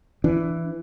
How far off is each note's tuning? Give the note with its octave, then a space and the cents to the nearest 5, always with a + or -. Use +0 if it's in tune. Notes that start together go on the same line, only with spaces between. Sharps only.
E3 +10 D4 +0